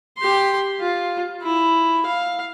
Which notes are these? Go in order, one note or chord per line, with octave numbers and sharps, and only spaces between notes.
G4 C6
F4
E4
F5